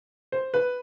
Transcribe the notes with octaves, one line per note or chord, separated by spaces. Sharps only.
C5
B4